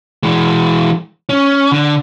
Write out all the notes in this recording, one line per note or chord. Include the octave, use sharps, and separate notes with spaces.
E3 G#3
C#4
D3